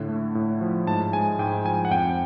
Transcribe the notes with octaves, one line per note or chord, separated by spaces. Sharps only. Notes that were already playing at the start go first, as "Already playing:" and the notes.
Already playing: A2 D3
A3
A2
F3
G#2 A5
G#3 G#5
G#2 G5
F3 G#5
F#5
F2 G5